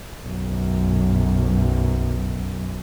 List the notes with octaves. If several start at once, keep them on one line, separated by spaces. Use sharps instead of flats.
B1 F#2